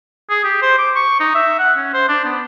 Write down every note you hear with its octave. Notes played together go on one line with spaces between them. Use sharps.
G#4
G4
C5
D6
C#6
D#4
E5
F#5
C#4
C5
D4
B3